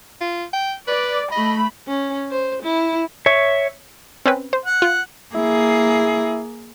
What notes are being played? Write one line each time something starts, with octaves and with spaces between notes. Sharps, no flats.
F4
G5
B4 D5
A3 D#5 B5
C#4
C5
E4
C#5 E5
C4 C#4 B4
C5
F#5
F4
A#3 E4 G#4